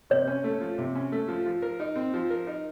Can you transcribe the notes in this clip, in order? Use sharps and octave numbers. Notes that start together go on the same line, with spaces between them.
C3 C#5
C#4
A3
F3
C3
C#4
A3
F3
F3
A#4
D#4
C4
F3
A#4
D#4